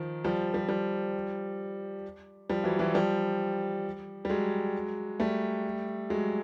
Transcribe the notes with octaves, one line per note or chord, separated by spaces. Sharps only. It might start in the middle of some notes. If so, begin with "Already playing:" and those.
Already playing: D#3 F3
F3 G3
F3 G3
F3 G3
F3 G3
E3 F#3
E3 F#3
F3 G3
G3
F#3 G#3
G3 A3
F#3 G#3